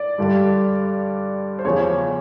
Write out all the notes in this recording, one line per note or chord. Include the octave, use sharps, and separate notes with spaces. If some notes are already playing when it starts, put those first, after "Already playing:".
Already playing: D5
G2 D3 G3
C5
E2 C#3 F3 C#5